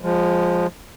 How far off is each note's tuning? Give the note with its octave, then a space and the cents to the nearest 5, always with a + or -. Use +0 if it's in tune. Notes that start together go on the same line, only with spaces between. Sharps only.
F3 +10 G#3 -20